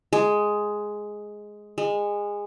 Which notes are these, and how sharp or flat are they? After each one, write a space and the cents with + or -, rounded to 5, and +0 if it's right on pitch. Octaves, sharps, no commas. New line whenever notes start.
G#3 +5
G#3 -20